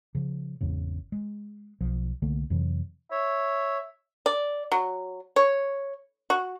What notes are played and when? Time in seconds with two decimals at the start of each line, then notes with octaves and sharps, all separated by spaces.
0.15 C#3 F3
0.61 G#1 E2 G#2 C#3
1.12 G#3
1.81 B1 F3
2.22 C2 D3 A3 A#3
2.50 F2 C3 E3 F#3
3.11 C#5 E5
4.26 D5
4.72 F#3
5.36 C#5
6.30 F#4